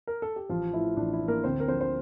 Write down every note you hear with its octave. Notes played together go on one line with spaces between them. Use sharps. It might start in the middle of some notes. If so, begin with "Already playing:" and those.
A#4
A4
G4
A1 F3 F4
A2 E3 E4
A1 D4
E4
A2 E3
A#3 A#4
D2 C4 C5
A#4
D3 F3 C4 C5
C5